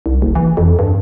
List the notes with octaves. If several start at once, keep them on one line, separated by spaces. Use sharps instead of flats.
C2
F#1
E3
F2
G2